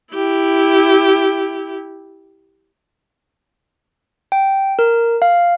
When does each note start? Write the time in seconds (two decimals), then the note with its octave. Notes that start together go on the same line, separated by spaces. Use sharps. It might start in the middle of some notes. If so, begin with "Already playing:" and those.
0.13 E4 G4
4.32 G5
4.79 A#4
5.22 F5